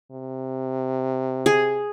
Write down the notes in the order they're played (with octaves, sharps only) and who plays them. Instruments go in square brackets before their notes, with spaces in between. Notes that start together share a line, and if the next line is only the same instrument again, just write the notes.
[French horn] C3
[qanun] G#4